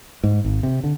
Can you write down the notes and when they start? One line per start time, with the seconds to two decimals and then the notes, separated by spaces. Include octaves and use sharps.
0.24 G#2
0.44 G#1
0.63 C3
0.84 D3